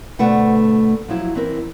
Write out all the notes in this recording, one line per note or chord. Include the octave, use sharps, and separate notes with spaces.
D2 B2 A3 B4 F#5
F3 F#3 E4
E3 C4 A#4